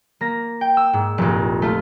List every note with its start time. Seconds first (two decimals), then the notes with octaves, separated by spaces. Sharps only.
0.21 A#3 A#6
0.61 G5
0.77 E6
0.93 G#2
1.18 F1 A#1
1.62 A3 F4